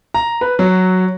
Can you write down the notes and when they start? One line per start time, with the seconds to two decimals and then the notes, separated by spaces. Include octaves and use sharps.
0.14 A#5
0.41 B4
0.59 F#3